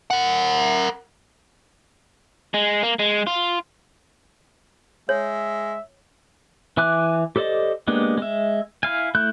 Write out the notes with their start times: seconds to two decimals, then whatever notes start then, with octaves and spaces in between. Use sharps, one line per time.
0.10 A#4 F#5
2.54 G#3
2.83 A#3
2.99 G#3
3.27 F4
5.09 G#3 C#5 E5
6.77 E3 E5 G#5 D6 F#6
7.36 G4 A4 C5 D5 D#5
7.87 G#3 A#3 B3 D4 G4
8.18 G#3 E5
8.83 E4 F5 G#5
9.15 A3 E4 F#6 G6